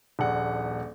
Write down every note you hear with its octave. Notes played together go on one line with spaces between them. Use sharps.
D#1 A#1 F#5